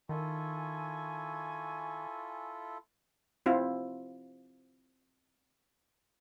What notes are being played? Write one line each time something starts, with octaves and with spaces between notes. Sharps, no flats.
D#3 E4 F4 A4 G#5 C#6
C4 E4 F4